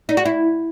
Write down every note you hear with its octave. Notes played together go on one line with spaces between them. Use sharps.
D#4
F#4
E4